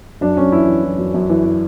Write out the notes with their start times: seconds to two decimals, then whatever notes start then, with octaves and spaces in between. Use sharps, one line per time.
0.21 F#2 D4
0.37 F#2 C#4
0.52 E3 E4
0.68 E3
0.84 E3
0.98 F#2
1.14 F#2
1.30 E3
1.45 E3